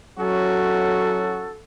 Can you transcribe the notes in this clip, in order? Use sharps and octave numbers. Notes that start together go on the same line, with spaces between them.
F#3 C#4 E4 F#4 A4